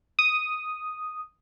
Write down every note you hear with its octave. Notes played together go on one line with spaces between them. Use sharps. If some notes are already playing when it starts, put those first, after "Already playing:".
D#6